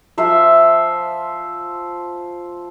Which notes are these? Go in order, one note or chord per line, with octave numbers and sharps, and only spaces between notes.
F3 C5 E5 F5